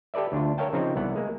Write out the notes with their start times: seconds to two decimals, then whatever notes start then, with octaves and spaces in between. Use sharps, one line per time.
0.14 G4 A4 B4 D5 E5
0.32 D2 D4 F4
0.58 A#4 C#5 E5 F5 G5 A5
0.73 C#3 F3 C4 D#4
0.96 C2 E3 B3 F#5
1.16 G#3 A#3